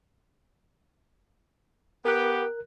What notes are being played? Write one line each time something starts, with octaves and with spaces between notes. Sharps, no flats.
B3 G4 A#4 F#6